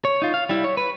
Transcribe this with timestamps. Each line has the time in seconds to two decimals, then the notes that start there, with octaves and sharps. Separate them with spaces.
0.05 C#5
0.22 D#4 F4
0.34 F5
0.49 G3 E4
0.64 C#5
0.77 B4